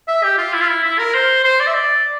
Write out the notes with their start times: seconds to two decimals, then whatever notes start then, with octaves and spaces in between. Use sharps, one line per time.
0.08 E5
0.23 G4
0.38 F4
0.54 E4
0.61 F4
0.69 E4
0.84 E4
0.99 A#4
1.14 C5
1.44 C5
1.60 D5
1.67 E5
1.74 D5